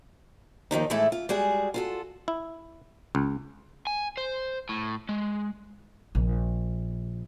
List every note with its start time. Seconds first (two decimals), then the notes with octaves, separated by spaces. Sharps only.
0.71 D#2 D#3 F3 D#4
0.90 A2 E3 G#3 A3 E4 A4
1.12 F4
1.29 G3 G#3 F#4 G#4
1.74 F4 F#4 A4
2.28 E4
3.15 C#2
3.87 G#5
4.17 C5
4.69 A2
5.09 G#3
6.15 A#1